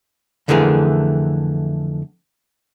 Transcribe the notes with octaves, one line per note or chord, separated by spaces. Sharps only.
F2 D3 E3 A3 G#4 A#4